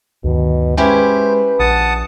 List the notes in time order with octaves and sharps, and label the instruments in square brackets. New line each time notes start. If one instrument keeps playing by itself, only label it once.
[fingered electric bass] D2 G2 D#3 [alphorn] B2
[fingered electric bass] G#3 [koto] C#4 E4 G4 [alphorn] B4 [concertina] C5
[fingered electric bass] A#1 [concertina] F#5 A5 D#6